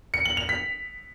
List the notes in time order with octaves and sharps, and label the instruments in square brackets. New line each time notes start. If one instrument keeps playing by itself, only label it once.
[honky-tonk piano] C#7
F#7
F7
B6